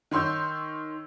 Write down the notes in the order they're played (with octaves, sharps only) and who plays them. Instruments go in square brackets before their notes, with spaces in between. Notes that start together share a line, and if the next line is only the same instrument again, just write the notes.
[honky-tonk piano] D#3 C#5 C6 E6 G6